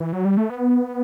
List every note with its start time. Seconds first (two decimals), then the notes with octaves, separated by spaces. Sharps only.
0.00 E3
0.13 F#3
0.25 G3
0.37 A3
0.50 B3